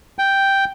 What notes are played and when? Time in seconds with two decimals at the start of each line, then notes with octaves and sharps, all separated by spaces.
0.19 G5